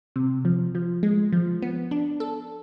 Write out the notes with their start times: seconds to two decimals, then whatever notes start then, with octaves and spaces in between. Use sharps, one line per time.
0.16 C3
0.45 F3
0.75 F3
1.03 G#3
1.32 F3
1.62 B3
1.91 D4
2.20 A4